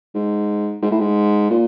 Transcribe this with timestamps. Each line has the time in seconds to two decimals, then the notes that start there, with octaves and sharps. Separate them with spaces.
0.15 G#2
0.82 G#2
0.92 A2
1.00 G#2
1.50 A#2